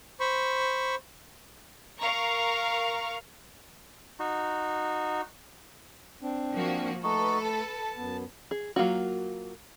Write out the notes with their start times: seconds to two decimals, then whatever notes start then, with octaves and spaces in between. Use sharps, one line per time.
0.20 C5 B5 C#6
1.99 A#4 F5 A#5 C#6
4.19 D#4 F#4
6.22 C4 D4
6.52 F3 A#3 F#4
7.03 A3 D#4 F#4 A4 B4
7.44 A5
7.97 F#2 B3
8.51 G#4
8.76 F#3 A#3 F4 F#4